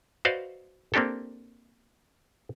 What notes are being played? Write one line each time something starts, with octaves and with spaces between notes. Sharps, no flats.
F#4 B4 C5 D5 D#5 F5
A#3 C4 D4 G4 A4